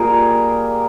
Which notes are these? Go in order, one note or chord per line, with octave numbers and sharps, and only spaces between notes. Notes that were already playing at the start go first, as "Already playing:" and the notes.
Already playing: A#2 G3 A#3 G#4 A#4 C5